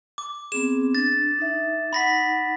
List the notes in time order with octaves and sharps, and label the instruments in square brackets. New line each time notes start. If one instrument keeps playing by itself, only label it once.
[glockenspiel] D6
[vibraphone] B3 C4 G#4 [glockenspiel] E7
[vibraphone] D4 [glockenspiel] A6
[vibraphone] D#4 E5
[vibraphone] D#4 F#5 [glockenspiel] B5 A#6 B6